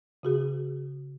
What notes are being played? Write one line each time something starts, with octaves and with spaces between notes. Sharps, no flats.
C#3 F#4 G#4